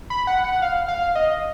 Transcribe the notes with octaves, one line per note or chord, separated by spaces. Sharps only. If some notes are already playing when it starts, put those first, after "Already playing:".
B5
F#5
F#5
F5
F5
D#5